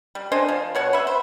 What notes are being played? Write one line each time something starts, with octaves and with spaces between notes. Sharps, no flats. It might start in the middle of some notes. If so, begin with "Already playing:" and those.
G3
D4 C5 D#5 G#5
F3
B2 C#5 F#5
B4 E5
C5